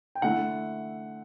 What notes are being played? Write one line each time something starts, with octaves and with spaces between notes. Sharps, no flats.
G5
D3 A3 E4 F#5